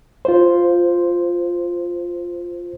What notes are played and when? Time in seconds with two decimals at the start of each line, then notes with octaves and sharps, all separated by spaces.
0.25 F4 C5